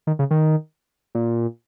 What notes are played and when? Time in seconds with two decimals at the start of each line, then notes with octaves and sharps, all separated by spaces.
0.07 D#3
0.19 C#3
0.31 D#3
1.15 A#2